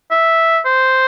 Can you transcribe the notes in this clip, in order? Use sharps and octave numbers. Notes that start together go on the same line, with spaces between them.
E5
C5